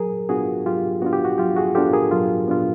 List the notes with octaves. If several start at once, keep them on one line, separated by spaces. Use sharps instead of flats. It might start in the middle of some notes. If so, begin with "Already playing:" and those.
Already playing: F#3 G#4 A#4
B3 D4 F4 F#4 G#4
F#3 F4 G4
B3 D4 F4 F#4
G4
F#4
F#3 F4 G4
F#4 G#4
B3 D4 F4 G4 A4
G#4 A#4
F#3 F4
B3 D4 F4